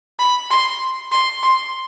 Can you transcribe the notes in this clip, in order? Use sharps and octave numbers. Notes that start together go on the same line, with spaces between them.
B5
C6
C6
C6